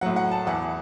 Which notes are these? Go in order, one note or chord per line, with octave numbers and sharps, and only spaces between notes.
A2 F#3 F#5
F#5
A5
E2 E3 F#5